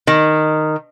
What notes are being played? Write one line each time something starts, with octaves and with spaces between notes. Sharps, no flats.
D#3